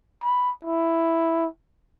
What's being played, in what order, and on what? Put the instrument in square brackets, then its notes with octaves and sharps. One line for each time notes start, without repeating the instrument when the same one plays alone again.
[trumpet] B5
E4